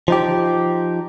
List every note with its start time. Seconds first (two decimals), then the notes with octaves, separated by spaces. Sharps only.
0.08 F3 D#4 G4